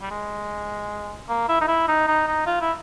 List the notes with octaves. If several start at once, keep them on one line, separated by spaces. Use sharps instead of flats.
G3
G#3
A#3
E4
D#4
E4
D#4
D#4
D#4
F4
E4